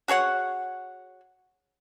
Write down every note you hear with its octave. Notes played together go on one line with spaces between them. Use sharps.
F#4 G#4 C#5 F#5